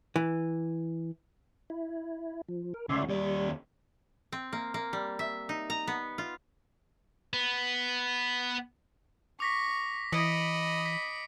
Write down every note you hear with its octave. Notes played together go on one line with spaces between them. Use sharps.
E3
E4
F3
A#4
D2 C#3 D5 E5 C6
D#2 G3 D5
C4
A#3
A#3
G3
E5
D#4
A#5
B3
F4
B3
C#6 D6 A#6 B6
E3 D#5 B5 D#6 C#7 D7
B6